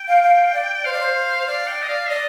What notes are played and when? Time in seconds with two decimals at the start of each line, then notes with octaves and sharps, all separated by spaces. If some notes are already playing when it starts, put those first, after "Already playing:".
Already playing: G5
0.08 F5
0.24 F5
0.54 D5
0.74 G5
0.85 C5 F5
0.93 D5
1.01 C5
1.47 D5 F5
1.67 G5
1.82 D#5
1.89 F5
2.10 D5 D#5